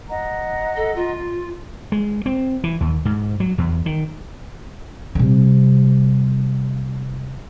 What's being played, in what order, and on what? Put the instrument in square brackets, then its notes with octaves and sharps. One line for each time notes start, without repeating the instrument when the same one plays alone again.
[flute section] D#5 F#5 A#5
[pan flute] A4
F4
[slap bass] G#3
C4
E3
D#2
G#2
F#3
E2
D#3
[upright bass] C3 G3